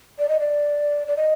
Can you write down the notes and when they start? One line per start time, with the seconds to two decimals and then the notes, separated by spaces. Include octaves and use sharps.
0.19 D5
0.29 D#5
0.40 D5
1.07 D5
1.17 D#5